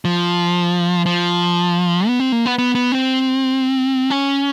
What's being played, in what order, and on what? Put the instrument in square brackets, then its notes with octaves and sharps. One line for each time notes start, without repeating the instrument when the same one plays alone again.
[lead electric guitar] F3
F3
B3
C4
A#3
B3
B3
B3
C4
C#4